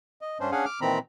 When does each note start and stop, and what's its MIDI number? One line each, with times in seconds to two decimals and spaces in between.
0.21 0.38 75
0.40 0.51 43
0.40 0.51 61
0.40 0.51 62
0.40 0.51 72
0.52 0.65 61
0.52 0.65 62
0.52 0.65 68
0.52 0.65 77
0.52 0.65 78
0.52 0.65 80
0.65 0.80 86
0.65 0.80 89
0.81 0.99 46
0.81 0.99 51
0.81 0.99 52
0.81 0.99 60
0.81 0.99 82
0.81 0.99 83